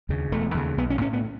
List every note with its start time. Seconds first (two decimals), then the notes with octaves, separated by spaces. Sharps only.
0.09 D#2 C#3
0.32 E1 A3
0.54 D#2 C#3
0.78 B1 B3
0.90 C#4
1.01 A2 C#4
1.13 B3